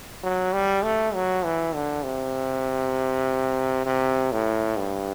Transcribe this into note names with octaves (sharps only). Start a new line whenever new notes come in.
F#3
G3
A3
F#3
E3
D3
C3
C3
A2
G2